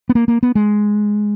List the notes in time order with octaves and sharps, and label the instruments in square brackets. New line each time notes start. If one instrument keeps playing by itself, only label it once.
[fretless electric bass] B3
A#3
A#3
B3
G#3